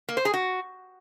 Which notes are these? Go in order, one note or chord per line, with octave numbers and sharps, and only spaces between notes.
A#3
C5
G#4
F#4